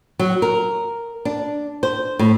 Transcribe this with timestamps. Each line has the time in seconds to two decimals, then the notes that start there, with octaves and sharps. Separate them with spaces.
0.19 F#3
0.42 A#4
1.25 D4
1.83 C5
2.19 A2